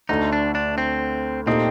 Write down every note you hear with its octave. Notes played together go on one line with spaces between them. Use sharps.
D2 D3 A3 D#4
D4
D4
C4
A#2 A3 C4 D#4 G4